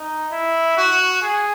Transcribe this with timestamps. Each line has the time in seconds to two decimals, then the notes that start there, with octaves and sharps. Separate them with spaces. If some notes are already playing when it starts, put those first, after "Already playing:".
Already playing: D#4
0.32 E4
0.78 F#4
1.23 G#4